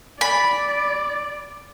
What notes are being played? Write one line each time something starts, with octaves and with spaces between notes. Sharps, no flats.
D5 B5